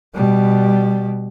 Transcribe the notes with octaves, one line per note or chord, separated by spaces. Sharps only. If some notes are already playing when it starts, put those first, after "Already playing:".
B2 G3